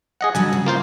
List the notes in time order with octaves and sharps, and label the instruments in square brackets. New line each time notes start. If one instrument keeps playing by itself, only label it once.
[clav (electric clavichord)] G#4 D#5 F#5
[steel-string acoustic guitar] D3 F#3 G3 [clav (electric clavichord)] G#5
[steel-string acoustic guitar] C#3
[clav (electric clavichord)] A#3 F4 C5